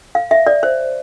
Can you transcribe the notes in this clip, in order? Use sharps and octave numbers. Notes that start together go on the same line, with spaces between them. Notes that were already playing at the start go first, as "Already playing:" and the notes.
F5
E5
D5
C5